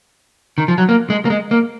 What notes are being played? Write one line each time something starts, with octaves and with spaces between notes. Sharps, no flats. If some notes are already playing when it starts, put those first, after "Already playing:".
D#3
F3
F#3
A#3
G#3
A#3
G#3
A#3